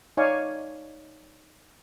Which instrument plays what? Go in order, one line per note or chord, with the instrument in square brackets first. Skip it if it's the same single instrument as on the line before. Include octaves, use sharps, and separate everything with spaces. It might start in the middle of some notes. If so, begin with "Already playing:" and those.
[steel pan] D#4 C#5 D5 F5 G#5 C#6